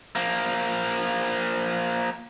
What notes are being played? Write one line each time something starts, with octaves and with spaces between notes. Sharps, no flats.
F3 A#3